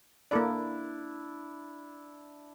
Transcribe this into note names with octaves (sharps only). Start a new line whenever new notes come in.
A#3 D4 E4 A4 D5